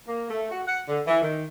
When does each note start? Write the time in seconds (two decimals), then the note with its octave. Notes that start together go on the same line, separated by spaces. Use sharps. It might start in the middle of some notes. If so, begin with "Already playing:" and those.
0.08 A#3
0.30 A3
0.51 F#4
0.68 F#5
0.88 D3
1.07 E3
1.22 D#3